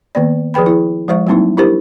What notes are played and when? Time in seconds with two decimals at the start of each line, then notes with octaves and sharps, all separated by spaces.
0.15 D#3 A#3 B3 D5
0.54 F3 G#4 B4 G5 B5
0.66 E4 G#4
1.08 F3 G#3 C5 E5 C#6
1.27 F#3 G3 A#3 C4 D#4 E4
1.57 D4 E4 G4 A#4 C5